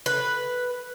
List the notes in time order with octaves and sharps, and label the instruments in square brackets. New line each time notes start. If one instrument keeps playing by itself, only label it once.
[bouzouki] B4